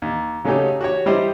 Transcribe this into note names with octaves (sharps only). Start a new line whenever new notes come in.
D#2
C#3 F#3 A3 C#4 D#4 G4
F#4 G4 C#5
G3 E4 G4 C5 D#5